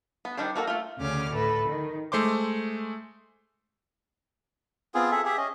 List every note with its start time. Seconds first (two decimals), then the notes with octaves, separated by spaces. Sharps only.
0.25 B3
0.37 D#3 G3 D4 C5
0.56 A#3 F#4 A4 A#4
0.67 A3 F4
0.98 D2 C#3 C#4 D6 F6
1.33 A2 A4 B4
1.67 D#3
2.12 G#3 A3 C5 C6 D6
4.94 B3 C4 F4 G#4
5.11 G#4 A4 E5
5.25 G4 G#4 E5
5.37 C#4 D#5